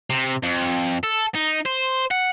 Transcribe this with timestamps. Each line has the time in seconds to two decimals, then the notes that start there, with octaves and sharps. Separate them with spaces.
0.10 C3
0.43 F2
1.03 A4
1.35 D#4
1.66 C5
2.11 F#5